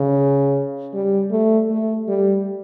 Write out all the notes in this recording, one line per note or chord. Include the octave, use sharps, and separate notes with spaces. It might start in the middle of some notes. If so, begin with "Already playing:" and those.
Already playing: C#3
G3
A3
A3
G3